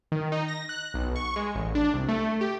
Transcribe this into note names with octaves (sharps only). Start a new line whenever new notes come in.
D#3
D#4
A#6
F#6
B1
C#6
G#3
A1
D4
C2
A3
G4